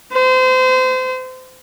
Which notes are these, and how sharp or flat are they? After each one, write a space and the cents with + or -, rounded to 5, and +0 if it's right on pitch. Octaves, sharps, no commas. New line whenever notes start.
C5 -30